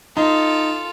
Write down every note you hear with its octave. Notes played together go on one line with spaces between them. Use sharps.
D#4 F4 A4